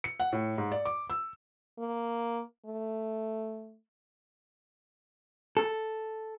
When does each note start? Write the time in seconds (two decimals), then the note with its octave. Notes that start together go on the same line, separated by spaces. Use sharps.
0.04 C#7
0.20 F#5
0.32 A2
0.58 G#2
0.72 D5
0.85 D6
1.10 E6
1.79 A#3
2.65 A3
5.57 A4